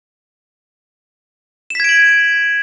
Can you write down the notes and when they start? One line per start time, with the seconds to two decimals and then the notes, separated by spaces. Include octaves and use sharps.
1.70 E7
1.75 B6
1.80 G#6
1.84 D7
1.89 F#7